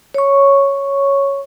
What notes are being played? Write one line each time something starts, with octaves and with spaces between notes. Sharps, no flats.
C#5 C#6